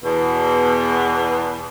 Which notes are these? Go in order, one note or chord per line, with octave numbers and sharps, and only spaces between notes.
E2 B2